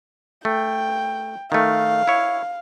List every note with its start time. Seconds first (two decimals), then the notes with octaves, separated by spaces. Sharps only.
0.45 A3 G5
1.52 D#3 A3 F5
2.07 E4 C#5